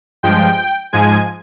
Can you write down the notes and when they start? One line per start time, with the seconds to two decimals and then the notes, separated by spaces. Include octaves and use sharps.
0.23 G2 F3 G#3 G5
0.93 G#2 F3 G#3 G#5